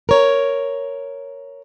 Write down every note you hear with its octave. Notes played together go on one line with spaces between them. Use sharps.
A#4 C#5